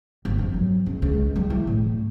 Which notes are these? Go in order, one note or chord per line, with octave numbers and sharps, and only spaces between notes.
G1
F2
F#3
C#2
C#2
G3
E3
A2